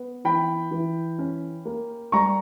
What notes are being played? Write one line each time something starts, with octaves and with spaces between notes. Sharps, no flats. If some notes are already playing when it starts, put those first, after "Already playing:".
Already playing: B3
E3 G5 B5
E3
C#4
A#3
G3 A#5 C#6